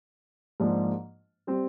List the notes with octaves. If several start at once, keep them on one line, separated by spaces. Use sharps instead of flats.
G#2 F3 A#3 D4
G3 C4